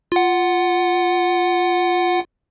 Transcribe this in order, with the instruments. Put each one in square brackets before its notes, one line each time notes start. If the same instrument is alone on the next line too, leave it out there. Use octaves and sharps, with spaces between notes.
[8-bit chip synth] F4 F#5